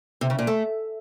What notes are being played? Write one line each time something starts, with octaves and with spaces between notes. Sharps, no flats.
C3
C#3
A#2
A3